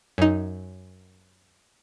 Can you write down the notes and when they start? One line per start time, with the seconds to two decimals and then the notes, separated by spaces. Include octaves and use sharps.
0.18 F#2 D#4